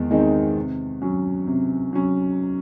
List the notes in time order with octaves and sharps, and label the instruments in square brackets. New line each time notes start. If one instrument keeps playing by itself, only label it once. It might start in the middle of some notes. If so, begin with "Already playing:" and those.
Already playing: [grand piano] E2 D#3 G#3 C4
D#3 G#3 C4 D#4
C3
F#3 C#4
C3
F#3 C#4